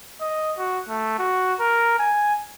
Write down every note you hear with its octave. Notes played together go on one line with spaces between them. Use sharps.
D#5
F#4
A3
F#4
A#4
G#5